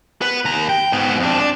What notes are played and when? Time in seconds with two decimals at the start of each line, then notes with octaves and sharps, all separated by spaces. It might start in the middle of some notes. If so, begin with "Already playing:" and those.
0.21 B3 B4
0.45 D#2 A#5
0.69 G5
0.92 G#2 B3
1.19 F2 D4
1.40 D4